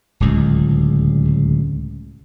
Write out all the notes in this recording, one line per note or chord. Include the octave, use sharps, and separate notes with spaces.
D1 C#2